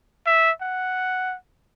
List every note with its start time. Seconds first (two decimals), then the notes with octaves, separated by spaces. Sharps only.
0.26 E5
0.61 F#5